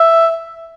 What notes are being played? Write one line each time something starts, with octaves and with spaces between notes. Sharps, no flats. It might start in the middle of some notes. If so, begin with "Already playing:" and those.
Already playing: E5